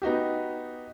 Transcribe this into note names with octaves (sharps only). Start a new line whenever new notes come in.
B3 D#4 F#4 G4